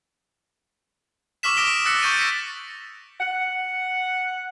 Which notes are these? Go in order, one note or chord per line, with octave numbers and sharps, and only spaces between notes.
C#6 D6 E6 F6 B6 E7
D6 D#6 A#6 D7 E7 G7
D#6 E6 F#6 A6 A#6 C#7
C#6 G6 A6 D#7
A#6 B6 C#7
F#5